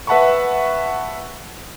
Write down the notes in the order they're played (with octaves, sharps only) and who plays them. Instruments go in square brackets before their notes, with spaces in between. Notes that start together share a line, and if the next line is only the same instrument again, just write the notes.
[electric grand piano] B4 E5 F#5 A5 B5 C#6